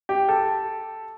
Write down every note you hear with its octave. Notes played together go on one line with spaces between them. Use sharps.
G4
A4